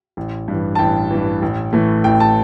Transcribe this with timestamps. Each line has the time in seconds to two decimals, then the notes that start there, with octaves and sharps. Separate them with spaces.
0.17 A1
0.48 G2 E3
0.75 A5
0.79 A1 G5
1.11 G2 E3
1.42 A1
1.73 A2 E3 A3
2.04 A1 G5
2.20 A5